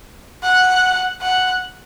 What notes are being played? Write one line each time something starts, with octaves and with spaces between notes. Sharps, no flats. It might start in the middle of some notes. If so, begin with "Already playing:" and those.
F#5
F#5